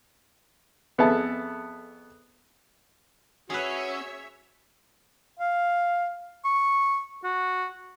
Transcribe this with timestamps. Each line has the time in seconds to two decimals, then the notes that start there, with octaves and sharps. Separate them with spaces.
0.98 F2 B3 G#4 A4 E5 A5
3.50 C#4 F#4 G#4 B4 C#5 E5
5.39 F5
6.45 C#6
7.24 F#4